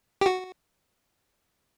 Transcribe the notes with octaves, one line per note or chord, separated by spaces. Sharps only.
G4
F#4